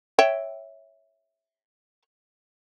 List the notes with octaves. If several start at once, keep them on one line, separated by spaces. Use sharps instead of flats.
C#5 E5 G5